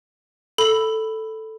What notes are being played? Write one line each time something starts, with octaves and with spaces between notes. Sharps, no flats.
A4 B5 F#7